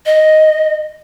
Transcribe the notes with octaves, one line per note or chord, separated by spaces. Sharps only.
D#5